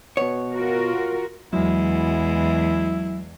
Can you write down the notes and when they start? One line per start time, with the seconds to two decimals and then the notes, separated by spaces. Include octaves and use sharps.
0.17 B2 B3 C#5
0.53 F4 F#4 A#4
1.53 E2 F#3 G#3 E4